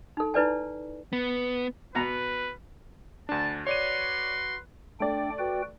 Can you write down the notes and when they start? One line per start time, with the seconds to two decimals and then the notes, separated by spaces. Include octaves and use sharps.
0.17 D#4 A4
0.34 D#4 E4 B4 D5 G#5
1.13 B3
1.95 B2 B3 B4 A#5
3.29 D2 D4 A5
3.67 F#4 B4 C#5 D5 C6 D#7
5.00 A3 D4 D5 G5
5.39 F#4 B4 G5